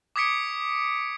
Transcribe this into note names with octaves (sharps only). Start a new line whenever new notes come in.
D6 D#6 G#6 B6 C#7 D7